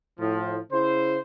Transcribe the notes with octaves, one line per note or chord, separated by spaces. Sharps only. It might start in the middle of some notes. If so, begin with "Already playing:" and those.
A2 F3
C#3 E4 C5